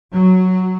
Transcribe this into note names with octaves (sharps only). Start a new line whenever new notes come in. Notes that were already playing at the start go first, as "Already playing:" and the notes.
F#3